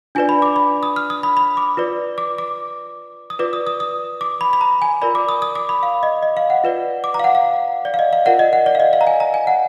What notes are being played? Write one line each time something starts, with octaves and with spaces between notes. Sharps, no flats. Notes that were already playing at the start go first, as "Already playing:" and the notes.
D4 F4 B4 D5 G#5
B5
D6
B5
D#6
F6
D#6
B5
B5
D6
F4 B4 D5
D6
D6
D#6
F4 B4 D5 D6
D#6
D#6
D#6
D6
B5
B5
A#5
G#5
F4 A#4 D5 B5
D6
D#6
D#6
D6
B5
F5
D#5
D#5
F5
F#5
F4 B4 D5
D6
A#5
F5
F#5
F5
D5
F5
D#5
F5
F4 A#4 D5 F#5
D#5
F#5
D5
F5
D#5
F5
A#5
G#5
A#5
G#5
F#5